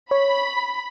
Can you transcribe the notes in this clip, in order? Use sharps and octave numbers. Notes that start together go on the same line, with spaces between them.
C#5 B5